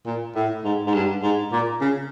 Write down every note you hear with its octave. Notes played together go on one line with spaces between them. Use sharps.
A#2
A2
G#2
G#2
G2
G#2
A#2
C#3